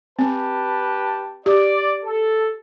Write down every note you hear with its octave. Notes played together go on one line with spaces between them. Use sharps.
C4 G4 B4 A5
G4 D5
A4